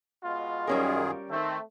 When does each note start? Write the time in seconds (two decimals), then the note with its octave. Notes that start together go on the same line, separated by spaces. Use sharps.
0.23 B2 G#3 F4
0.67 F#2 D#3 G3 C#4 G#4 A#4
1.30 D#3 A3 C4